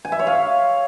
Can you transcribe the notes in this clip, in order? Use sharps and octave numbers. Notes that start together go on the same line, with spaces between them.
G#5
E5
C#5
F5